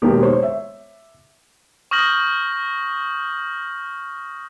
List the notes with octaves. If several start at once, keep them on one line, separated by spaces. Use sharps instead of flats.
E1 D#3 A#3 G4
C5 C#5
E5
C#6 D#6 F6 G6 A#6 F#7